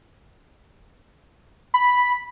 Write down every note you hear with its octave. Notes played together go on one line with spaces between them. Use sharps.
B5